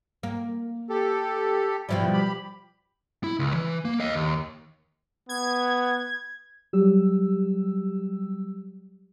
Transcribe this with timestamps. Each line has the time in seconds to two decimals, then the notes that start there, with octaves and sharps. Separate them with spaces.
0.23 A#3
0.90 G4 A4
1.89 B2 F3 G3 E4
2.13 G4 B5
3.24 E4
3.39 C#2
3.54 E3
3.85 A#3
4.00 D#5 F5
4.14 D#2
5.29 B3 G#6
6.73 F#3 G3 G4 E6